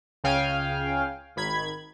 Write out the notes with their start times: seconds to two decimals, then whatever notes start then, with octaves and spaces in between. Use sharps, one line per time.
0.24 C#2 C#3 F5 G5 G#5 F6
1.36 G#1 D#3 B5 G#6